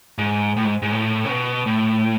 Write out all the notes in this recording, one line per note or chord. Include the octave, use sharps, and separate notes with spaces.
G#2
A2
G#2
G#2
A2
C#3
B2
A2